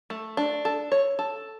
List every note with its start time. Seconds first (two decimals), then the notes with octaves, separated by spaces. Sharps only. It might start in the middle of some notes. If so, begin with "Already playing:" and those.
0.10 A3
0.37 D4
0.65 A4
0.92 C#5
1.19 A4